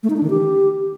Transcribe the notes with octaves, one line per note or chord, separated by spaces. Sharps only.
A3
D#4
D4
D#3
G4